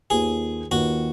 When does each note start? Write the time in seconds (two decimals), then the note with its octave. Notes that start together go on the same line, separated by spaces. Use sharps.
0.10 D#2 D#3 A#3 F4 G#4 B4
0.71 D#2 D#3 A#3 F4 F#4 B4